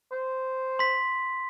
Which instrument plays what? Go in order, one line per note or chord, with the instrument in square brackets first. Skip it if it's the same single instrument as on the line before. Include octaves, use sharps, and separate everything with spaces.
[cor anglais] C5
[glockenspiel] C6 B6